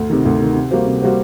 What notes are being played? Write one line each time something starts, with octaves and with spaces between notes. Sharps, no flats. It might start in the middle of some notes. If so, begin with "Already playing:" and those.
Already playing: D2
C3 D#3
D2
C3 D#3
C3
G3 A#3 F#4 C5
C3
G3 A#3 F#4 C5